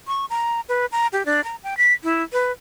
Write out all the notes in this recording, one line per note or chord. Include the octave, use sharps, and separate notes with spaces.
C#6
A#5
B4
A#5
G4
D4
A#5
G5
B6
E4
B4